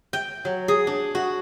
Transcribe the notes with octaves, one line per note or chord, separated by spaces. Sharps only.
G5
F#3
G#4
D4
F#4